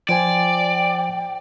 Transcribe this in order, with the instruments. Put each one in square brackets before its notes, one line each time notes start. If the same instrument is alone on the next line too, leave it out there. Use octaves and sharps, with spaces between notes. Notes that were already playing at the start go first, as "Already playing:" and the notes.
[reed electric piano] F3 C5 G#5 [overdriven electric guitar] D5 [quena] G5